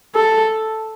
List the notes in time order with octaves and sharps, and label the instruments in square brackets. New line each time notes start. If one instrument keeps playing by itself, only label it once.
[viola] A4